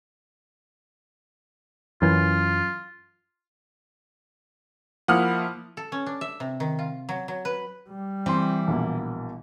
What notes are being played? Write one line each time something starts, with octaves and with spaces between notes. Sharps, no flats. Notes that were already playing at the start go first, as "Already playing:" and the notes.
F#2 E3 F4
F3 A#3 E4 F#5 D#6 F6
A4
C#4
D4
E5
C3
D#3
F4
F#3
F#3
B4
G3
E3 C4 C6
A#1 B2 A#3